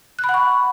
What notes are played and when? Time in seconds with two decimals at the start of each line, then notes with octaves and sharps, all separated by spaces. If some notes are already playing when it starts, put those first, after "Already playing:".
0.19 F#6
0.24 B5
0.29 F#5
0.34 C#6